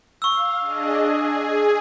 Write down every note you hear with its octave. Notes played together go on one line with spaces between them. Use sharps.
F5 C#6 E6
D4 G#4 D#5
G#4